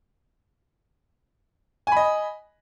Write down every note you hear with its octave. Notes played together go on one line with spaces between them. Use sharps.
D#5 G#5 B5